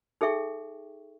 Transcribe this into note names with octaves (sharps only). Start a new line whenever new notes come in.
D#4 G#4 A4 E5 G5 C#6